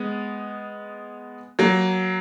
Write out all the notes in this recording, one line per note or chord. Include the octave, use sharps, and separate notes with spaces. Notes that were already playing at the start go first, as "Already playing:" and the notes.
Already playing: G#3 B3
F#3 A#3